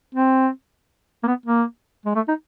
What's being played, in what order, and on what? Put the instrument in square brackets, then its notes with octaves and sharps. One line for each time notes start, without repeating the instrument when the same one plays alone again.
[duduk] C4
A#3
B3
A#3
G#3
A3
D#4